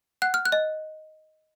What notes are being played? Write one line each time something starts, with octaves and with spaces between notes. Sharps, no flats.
F#5 F#6
F6
F#6
D#5